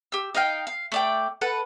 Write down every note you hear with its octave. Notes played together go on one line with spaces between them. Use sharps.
G4 E6
D#4 D#5 F5 G5
F5
A3 D5 G5
A4 B4 F#5